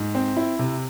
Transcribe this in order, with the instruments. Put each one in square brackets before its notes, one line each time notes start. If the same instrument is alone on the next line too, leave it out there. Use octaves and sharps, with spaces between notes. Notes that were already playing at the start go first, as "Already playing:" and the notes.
Already playing: [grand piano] G#2
C4
E4
C3